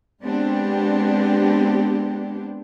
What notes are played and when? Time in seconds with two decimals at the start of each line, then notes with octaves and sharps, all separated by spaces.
0.22 G#3 B3 C4 D4 G4